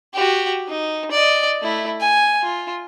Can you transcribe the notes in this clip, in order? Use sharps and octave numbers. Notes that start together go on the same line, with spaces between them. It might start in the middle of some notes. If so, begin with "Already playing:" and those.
F#4 G4
D#4
D5 D#5
A3 E4
G#5
F4